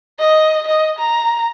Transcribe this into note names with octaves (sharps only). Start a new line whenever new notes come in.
D#5
D#5
A#5